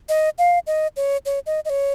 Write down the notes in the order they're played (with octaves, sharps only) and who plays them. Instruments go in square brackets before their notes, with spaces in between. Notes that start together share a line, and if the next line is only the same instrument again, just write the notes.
[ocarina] D#5
F5
D#5
C#5
C#5
D#5
D#5
C#5